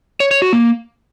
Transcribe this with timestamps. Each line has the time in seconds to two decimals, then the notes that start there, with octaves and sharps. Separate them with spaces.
0.20 C#5
0.31 C#5
0.42 F#4
0.53 A#3